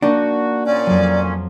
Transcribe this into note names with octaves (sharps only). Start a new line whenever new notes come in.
A#3 D4 D#4 F#4 F#5
A#2 C#4 D5
F2 F#3